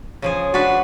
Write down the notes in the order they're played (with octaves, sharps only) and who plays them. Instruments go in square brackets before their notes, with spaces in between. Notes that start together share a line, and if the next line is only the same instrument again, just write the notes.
[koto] C#3 F3 G#4
[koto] D4 B4 [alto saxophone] F#4